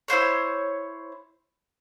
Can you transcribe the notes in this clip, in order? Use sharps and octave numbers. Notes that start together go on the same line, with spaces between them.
E4 F4 C5 C#5